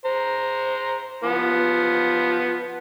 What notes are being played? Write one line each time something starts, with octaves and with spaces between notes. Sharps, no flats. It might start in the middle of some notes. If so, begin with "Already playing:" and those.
C5 A#5
F3 B3